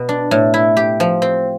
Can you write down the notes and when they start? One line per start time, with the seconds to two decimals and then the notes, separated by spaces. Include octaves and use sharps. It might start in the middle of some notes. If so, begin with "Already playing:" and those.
Already playing: B2 B3
0.09 D4
0.31 A2
0.54 E4
0.77 G4
1.00 F3
1.22 C4